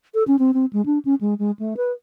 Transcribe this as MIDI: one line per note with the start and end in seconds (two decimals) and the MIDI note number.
0.14 0.24 69
0.27 0.36 61
0.39 0.51 60
0.54 0.65 60
0.73 0.84 56
0.86 0.98 62
1.05 1.15 61
1.21 1.34 56
1.39 1.51 56
1.59 1.74 57
1.77 1.92 71